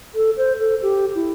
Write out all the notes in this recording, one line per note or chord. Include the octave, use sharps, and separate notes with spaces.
A4
C5
A4
G4
E4